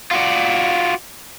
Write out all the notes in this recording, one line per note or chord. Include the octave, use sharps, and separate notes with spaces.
F4 F#4 D5